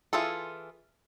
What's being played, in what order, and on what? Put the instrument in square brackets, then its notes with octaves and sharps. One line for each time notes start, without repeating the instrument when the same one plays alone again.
[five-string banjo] E3 F4 G#4 A4